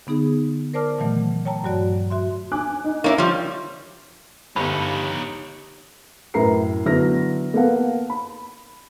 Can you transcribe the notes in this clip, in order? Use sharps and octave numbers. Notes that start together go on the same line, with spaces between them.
D3 B3 D#4 G#4
A#4 C5 D5 A5 D6 F6
A#2 D#3 E3 F#3 A3
C#5 G5 A5 A#5
G2 F#3 F#4 D5
F#4 E5 C6
G#5 D6 F#6
D#4
A#3 D#4 E4 C#5
F3 G3
G1 D#4 G4 C#5 B5
F#2 A2 A#4 B4 A#5 C7
D3 F#3 B3 E4 F6 A#6
A#3 B3 A4 F5 F#5
B5